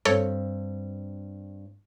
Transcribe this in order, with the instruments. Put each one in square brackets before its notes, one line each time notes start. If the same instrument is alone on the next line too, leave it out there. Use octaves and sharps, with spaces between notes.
[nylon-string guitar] G2 C4 [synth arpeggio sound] A4 C#5